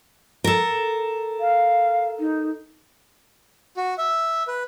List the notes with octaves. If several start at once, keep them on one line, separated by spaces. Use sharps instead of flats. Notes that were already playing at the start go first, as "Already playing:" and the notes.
A4 A#4
F5
D#4
F#4
E5
B4